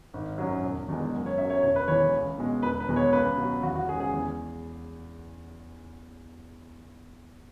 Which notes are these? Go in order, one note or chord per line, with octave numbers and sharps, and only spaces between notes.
G#1
F#2 F#3
E1
E2 B2 G#3
F#1
C#5
F#2 F#3 E5
C#5
E1 C#5
B4
E2 E3 G#3 C#5
C#2
B2 G#3
E1 B4
B4
E2 B2 G#3
C#5
C#2 B4
B2 F#3
E2 F#4
F#4
C#3 G#3 G#4
G#4
E2